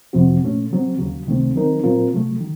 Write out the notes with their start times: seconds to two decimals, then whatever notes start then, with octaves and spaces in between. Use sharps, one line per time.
0.13 F2 C3 F3 C4 F#4
0.43 A#2 A3 C#4
0.71 C#3 F#3 C4
0.99 D#2 C#3 F#3
1.27 C#2 C3 D#3 A3 C4
1.55 D#3 F#3 C4 D#4 A#4
1.83 A#2 F#3 C4 F4 A#4
2.13 C3 F#3 A3
2.40 D#3